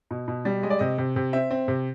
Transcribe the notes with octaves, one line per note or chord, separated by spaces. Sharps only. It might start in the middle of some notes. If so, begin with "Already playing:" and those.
B2
B2
G3
G#3 D#5
D5
C3 D#5
C3
C3
C4 E5
C4
C3